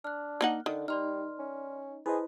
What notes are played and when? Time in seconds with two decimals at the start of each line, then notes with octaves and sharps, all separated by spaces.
0.04 D4 F6 F#6
0.41 A#3 D#4 F#5
0.66 D3 D#3
0.88 G3 D#4 D5 C6 F6
1.39 C#4
2.06 E4 G#4 B4 C5 D#5